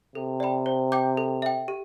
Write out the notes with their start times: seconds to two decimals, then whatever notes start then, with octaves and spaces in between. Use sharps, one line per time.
0.15 C3 A4
0.40 D5 G5 B5
0.66 C5
0.92 G5 D6 G6
1.17 A4
1.42 E5 G5
1.68 G4